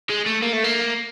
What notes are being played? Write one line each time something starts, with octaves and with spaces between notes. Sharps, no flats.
G#3
A3
A#3
A3
A#3